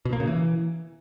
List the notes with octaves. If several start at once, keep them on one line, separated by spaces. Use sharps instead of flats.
B2
A#3
C#3
E3